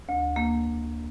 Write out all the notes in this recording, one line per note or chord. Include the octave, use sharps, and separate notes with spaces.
D2
A#3